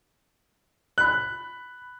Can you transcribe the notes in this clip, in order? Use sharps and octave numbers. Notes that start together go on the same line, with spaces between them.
B5 F#6